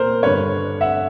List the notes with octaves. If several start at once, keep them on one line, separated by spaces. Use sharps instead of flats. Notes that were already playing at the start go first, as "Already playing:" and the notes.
Already playing: A#2 A#4 C5
G2 D3 B4 C#5
E5 F#5